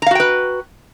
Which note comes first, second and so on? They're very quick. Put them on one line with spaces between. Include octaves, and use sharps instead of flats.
A#5 F5 F#4 G5 B4